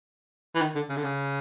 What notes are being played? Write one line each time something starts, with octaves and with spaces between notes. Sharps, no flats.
E3
D#3
D3
C#3
D3
C#3